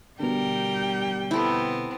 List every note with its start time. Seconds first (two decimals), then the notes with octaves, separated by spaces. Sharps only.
0.20 B2 D3 G3 A#4 G5
1.31 B3 C4 E4 A4